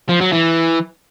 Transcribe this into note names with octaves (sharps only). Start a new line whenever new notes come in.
F3
F#3
E3